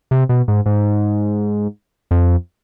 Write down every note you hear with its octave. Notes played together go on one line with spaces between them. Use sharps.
C3
B2
G#2
G#2
F2